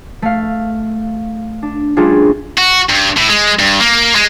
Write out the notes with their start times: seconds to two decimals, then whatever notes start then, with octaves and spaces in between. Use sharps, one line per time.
0.22 A3 F5
1.62 D4
1.97 G3 A3 C#4 D4 F4 G#4
2.58 F#4
2.90 G2
3.17 A2
3.29 G#3
3.59 G2
3.80 A#3
4.15 G#3